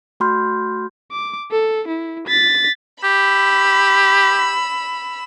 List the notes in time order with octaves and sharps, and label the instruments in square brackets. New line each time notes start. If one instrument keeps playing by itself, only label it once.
[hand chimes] A3 F#4 B5 C6 F6 G6
[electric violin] D6
A4
E4
A6 B6
[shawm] G4 [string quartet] B5 E6